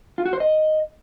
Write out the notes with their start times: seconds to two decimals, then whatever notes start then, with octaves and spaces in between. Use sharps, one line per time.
0.18 F4
0.25 F#4
0.33 C5
0.40 D#5